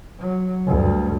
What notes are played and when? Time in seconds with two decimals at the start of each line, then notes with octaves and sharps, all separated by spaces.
0.20 F#3
0.67 D2 G2